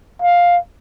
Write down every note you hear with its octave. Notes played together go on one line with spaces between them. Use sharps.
F5